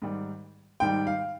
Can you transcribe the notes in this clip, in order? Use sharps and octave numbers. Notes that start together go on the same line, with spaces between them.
G#2 D#3 G3
G#2 D#3 G3 G5
F5